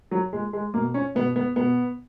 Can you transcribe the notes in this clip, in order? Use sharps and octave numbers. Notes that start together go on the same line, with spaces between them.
F#3
A#2 G#3
G#3
B2 A#3
C#4
B2 B3
B3
B2 B3